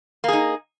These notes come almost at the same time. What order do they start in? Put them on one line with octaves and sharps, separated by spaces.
A#3 G#4 D#4